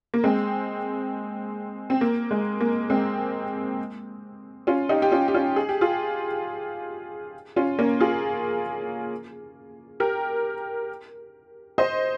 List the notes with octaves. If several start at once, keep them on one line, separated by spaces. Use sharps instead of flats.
A#3
G#3 C4
C4
A#3
G#3
A#3
G#3 C4
C#4 F4
D#4 G4
G4
C#4 F4
G4
C#4 F4
G#4
G4
F4 G#4
C#4 F4
A#3 C#4
F4 G#4
G4 A#4
C5 D#5